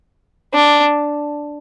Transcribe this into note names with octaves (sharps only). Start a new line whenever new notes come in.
D4